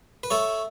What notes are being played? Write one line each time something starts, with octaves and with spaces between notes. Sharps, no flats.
B4
A3 A4 C#5